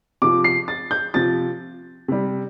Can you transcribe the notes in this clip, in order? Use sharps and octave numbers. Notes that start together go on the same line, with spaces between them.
C3 F3 D6
C7
A6
G6
C3 F3 A6
C3 G3